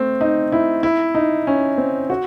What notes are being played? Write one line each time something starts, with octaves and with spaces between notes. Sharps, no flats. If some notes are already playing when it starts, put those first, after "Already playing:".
Already playing: A3 C4
D#4
E4
E4
D#4
C#4
C4
F#4